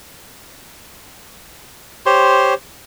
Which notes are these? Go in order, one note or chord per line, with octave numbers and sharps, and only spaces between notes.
G4 C5 C#5 C6